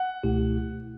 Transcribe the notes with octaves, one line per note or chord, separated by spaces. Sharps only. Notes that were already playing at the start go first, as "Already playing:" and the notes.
Already playing: F#5
C#2 B2 A3 E4 G4